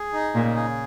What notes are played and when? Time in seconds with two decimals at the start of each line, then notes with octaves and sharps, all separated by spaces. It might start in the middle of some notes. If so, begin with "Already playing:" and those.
Already playing: G#4
0.13 D#4
0.34 A#2 C#3
0.56 G#4